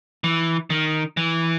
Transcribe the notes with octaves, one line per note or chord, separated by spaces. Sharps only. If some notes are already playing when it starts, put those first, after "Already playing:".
E3
D#3
E3